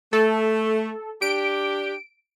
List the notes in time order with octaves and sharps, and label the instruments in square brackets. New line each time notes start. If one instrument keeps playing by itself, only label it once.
[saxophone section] A3 [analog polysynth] A4
[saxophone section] D4 G4 [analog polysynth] D7